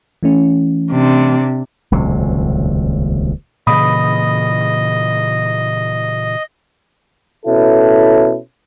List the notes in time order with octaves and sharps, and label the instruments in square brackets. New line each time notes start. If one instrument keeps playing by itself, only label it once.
[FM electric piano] E3 A3 C#4
[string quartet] C3 D4
[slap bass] D#1 C#2 C3 F#3
[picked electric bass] A#2 C#3 E3 [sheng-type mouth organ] D#5 [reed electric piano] B5 D#6
[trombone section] B2 C#4 E4 A4